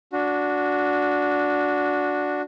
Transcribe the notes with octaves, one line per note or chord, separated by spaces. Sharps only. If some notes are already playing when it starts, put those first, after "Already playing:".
D4 F#4